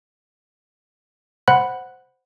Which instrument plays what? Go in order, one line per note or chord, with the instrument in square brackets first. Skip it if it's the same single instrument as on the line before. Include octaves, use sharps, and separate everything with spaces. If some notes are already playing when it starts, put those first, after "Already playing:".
[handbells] C5 F#5 B5 F#6